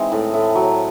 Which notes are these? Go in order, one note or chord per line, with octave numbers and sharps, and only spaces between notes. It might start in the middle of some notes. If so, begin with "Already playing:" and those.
Already playing: E3 G#3 C4 D#4
A2
A2
F#3